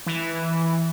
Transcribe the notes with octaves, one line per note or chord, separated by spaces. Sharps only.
E3